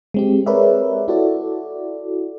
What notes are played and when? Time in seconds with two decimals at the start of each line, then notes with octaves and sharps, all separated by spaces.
0.14 G#3 C4 G4
0.46 G#4 A#4 B4 C#5 D5 E5
1.08 E4 F#4 A4 D5